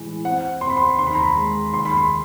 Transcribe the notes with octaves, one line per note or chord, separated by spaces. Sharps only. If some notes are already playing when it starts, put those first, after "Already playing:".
Already playing: A2 E3 G#3
C4 F#5
C4 C6
B5
C6
D#2 C6
B5
A#5
B5
G#3
D#2 C6
B5
C6